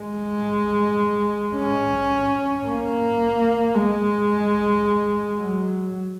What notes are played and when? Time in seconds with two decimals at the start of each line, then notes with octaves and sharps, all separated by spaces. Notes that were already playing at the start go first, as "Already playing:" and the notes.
Already playing: G#3
1.56 C#4
2.65 A#3
3.74 G#3
5.37 F#3